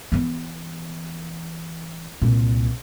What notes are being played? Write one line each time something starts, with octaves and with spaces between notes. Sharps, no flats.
E3 B3
C2 A#2